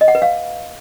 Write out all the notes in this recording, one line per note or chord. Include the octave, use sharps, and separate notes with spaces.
D#5
F#5
B4
F5